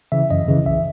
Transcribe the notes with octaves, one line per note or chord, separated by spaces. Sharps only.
C#3 E3 E5
F#2 D#5
C#3 E3
B1 E5